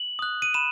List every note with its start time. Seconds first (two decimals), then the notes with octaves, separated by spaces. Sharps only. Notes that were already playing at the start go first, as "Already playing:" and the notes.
Already playing: F#7
0.19 D#6 F#6
0.42 D#7
0.54 B5 E7